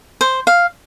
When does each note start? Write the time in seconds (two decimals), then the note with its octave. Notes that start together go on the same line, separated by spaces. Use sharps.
0.21 C5
0.47 F5